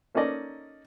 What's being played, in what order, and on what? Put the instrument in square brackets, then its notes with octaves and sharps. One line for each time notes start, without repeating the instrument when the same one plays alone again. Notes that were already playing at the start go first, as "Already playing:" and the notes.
[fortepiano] A#3 C#4 D#4 A4 D5 D#5